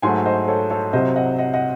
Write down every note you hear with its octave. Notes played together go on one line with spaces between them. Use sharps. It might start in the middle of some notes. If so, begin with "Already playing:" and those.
G#2 F#3 A3 G#5 C6
C5 D#5
A4 C#5
A4 C#5
C2 C3 F#3 C5 D#5
D#5 F#5
D#5 F#5
D#5 F#5